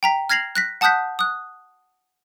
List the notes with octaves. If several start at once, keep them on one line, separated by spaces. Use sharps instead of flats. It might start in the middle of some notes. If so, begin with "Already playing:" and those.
G5 A#5 B6
F6 G#6 A#6 C7 F7 F#7
F#6 A#6 B6
F#5 A5 D#6 F#6 G6 B6
D#6 F#6